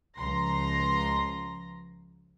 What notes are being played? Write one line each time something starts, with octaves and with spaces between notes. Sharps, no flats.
C#2 F3 A#5 C6 A#6